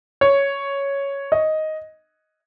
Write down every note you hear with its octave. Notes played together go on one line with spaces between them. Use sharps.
C#5
D#5